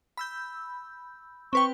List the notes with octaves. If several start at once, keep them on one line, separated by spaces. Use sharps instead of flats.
B5 E6 G6
C4 B4 G5 C#6